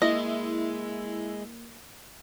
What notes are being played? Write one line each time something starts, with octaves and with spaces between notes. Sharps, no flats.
G#3 A#3 E4 D#5